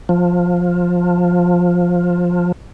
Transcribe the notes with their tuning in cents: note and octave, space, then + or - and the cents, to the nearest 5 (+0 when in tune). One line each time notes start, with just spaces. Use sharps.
F3 +15